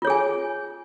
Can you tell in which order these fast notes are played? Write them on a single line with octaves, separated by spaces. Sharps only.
F4 C#5 G#4 G#5